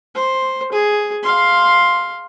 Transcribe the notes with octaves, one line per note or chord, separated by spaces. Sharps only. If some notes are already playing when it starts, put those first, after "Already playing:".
C5
G#4
F5 C6